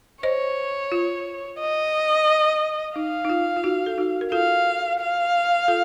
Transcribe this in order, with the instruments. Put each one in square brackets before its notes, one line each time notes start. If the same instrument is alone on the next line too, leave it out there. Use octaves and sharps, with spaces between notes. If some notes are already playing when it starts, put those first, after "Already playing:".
[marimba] C5 D#5 [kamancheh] C#5
[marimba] F4
[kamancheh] D#5
[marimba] D#4 [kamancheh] F5
[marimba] D#4
F4
F4
D#4 F#4
A4
D#4 F#4
A#4
[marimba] F4 A4 [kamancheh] F5
[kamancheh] F5
[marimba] F4 A4